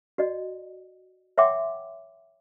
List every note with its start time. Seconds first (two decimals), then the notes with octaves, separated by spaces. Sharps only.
0.18 F#4 D5 D#5
1.38 C#5 E5 F#5 G5 C6 D6